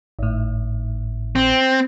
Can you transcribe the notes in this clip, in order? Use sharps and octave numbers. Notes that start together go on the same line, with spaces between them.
G#1 A2
C4